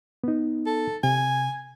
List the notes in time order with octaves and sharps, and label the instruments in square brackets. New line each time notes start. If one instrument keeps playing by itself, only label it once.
[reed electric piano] B3 D#4
[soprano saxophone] A4
[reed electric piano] C3 [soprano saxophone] G#5